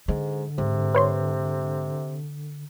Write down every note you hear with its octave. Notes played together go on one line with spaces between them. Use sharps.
G#2 D3 G#3
G#2 C3
B4 C#5 C6